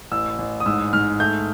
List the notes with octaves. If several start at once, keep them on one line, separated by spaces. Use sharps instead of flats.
A1 E6
A1
D#6
G#2 E6
G#2 F6
A3 G6